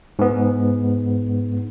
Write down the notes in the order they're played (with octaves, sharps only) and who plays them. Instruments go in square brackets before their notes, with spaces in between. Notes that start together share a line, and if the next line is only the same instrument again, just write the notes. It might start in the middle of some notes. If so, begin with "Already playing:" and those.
[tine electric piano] G#2 B3